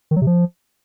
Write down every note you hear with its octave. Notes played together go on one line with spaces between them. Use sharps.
D#3
F#3
C3
F3